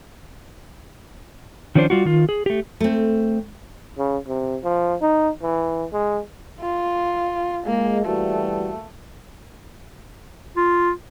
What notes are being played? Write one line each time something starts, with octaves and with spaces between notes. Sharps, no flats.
D#3 F3 C#4 D4 C5
G3 F4 F#4
D#3 F4
G#4
A3 G4
A3 C4
C#3
C3
F3
D#4
E3
G#3
F4
G#3 A#3
E3 G3 A3 F#4
F4